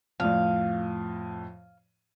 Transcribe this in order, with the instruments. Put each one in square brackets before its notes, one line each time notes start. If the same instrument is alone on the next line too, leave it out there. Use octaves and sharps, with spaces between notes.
[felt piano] F2 A2 [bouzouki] F5